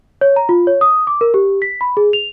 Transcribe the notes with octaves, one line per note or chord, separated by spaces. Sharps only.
C#5
A#5
F4
C#5
D#6
D6
A#4
G4
B6
B5
G#4
F7